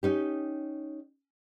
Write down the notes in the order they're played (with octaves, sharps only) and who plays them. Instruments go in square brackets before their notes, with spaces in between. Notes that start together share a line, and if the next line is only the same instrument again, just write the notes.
[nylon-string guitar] C#4 D#4 G4